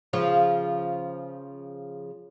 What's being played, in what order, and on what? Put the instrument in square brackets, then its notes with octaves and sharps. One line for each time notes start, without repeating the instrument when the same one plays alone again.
[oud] C#3 F3 F4